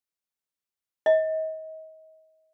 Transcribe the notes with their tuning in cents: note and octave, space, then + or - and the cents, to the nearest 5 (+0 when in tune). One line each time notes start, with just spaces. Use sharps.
D#5 +35